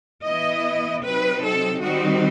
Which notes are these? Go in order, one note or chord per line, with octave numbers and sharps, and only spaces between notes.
E3 B3 E4 D#5
C3 F#3 C4 D#4 B4
A4
D#3 G3 C4 D#4 F#4